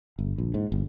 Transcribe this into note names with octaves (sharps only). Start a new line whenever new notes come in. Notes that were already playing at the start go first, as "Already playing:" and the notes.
G1
A#1
G#2
G1